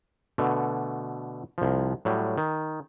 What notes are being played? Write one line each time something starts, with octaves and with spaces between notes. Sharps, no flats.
B2 D3 A3
C2 F3
A2 F#3 G3
D#3